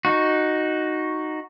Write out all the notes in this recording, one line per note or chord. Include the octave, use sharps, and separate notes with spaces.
D#4 F#4